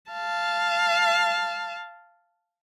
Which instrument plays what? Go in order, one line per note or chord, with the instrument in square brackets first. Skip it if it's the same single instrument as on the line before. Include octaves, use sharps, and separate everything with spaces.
[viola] F5 A5